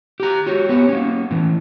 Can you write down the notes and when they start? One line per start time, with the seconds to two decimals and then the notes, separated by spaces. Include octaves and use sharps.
0.20 G4 A#5
0.46 F#4 G4 C#5
0.69 B3 G4 C#5
0.89 A#3 C#4
1.31 A2 E3